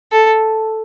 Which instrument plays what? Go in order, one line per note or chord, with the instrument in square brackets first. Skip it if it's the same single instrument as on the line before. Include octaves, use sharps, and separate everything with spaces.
[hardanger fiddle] A4